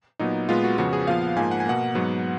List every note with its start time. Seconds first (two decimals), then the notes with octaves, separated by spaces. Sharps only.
0.19 A#2 F#3 B3 D#4
0.49 A#2 G#3 B3 F4
0.64 F#4
0.78 F2 C#3 F3 B3 F#4
0.93 G#4
1.07 A#2 F3 B3 F5
1.22 F#5
1.36 G#2 F3 A#3 G#5
1.51 F#5
1.60 G#5
1.66 B2 A#3 F#5
1.95 G#2 F#3 B3